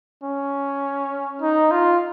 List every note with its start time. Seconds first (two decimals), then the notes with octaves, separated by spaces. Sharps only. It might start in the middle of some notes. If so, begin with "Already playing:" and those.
0.24 C#4
1.42 D#4
1.72 F4